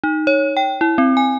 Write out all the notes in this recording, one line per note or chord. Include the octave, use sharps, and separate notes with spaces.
D#4
C#5
G5
E4
C4
G#5